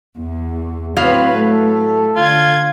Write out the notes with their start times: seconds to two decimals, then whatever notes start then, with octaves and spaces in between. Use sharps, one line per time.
0.15 E2
0.97 A2 F#3 C4 B4 F5
1.35 A3 A4
2.16 D3 F4 G#6